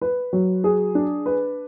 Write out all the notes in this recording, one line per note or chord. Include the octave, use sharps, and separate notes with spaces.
B4
F#3
G#4
D4
B4